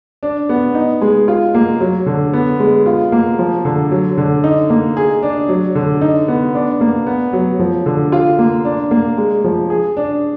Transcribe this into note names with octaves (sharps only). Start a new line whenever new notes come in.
D4
B3
D#4
G#3
F4
A#3
F#3
D3
B3
G#3
F4
A#3
F3
D3
F#3
D3
D#4
A#3
G#4
D4
F#3
D3
D#4
B3
D4
A#3
B3
F#3
F3
D3
F4
A#3
D4
A#3
G#3
F3
G#4
D4